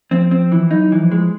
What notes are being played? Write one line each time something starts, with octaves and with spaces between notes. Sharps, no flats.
F3 C4
C4
E3
F#3 D#4
E3
F3
G#3